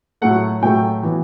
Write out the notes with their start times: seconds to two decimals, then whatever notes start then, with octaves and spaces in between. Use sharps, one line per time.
0.21 A2 F#3 A3 F#5
0.62 A2 F#3 A3 G5
1.03 E3 B3